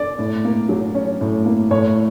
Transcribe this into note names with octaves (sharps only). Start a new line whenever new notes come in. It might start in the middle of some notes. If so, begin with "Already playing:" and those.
Already playing: D5
A2
A#3
F#3
C#4
A2
A#3
A2 C#5